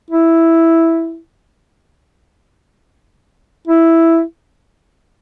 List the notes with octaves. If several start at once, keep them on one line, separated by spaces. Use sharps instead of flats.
E4
E4